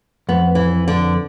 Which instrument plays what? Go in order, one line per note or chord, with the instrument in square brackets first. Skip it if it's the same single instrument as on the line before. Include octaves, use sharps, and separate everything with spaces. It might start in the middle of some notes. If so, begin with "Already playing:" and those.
[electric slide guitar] F2 [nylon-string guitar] B3
[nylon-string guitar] E3
D3